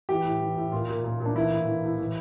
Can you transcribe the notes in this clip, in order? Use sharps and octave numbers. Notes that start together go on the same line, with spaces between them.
E3 G4
A2
E3
A2
A#2 F4
A#2
A#2
A#2
D4
E3 E4
A2
E3
A2
E3